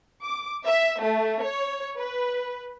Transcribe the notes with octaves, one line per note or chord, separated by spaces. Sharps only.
D6
E5
A3
C#5
B4